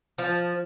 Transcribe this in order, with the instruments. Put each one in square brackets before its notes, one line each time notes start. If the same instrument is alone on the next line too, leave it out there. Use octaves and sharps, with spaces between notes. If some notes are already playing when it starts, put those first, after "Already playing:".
[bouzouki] F3